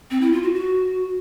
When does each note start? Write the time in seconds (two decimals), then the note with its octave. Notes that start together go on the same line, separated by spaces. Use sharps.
0.11 C4
0.21 E4
0.32 F4
0.43 F#4
0.54 F#4